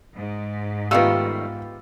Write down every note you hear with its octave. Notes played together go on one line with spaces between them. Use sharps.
G#2
D#3 G3 A3 B3 F4 G4 F5 E6